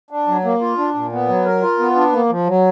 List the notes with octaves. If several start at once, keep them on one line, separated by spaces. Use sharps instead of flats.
D4
F#3
A#3
F4
D4
A#2
B3
F#3
A#4
F4
B3
D4
A#3
F3
F#3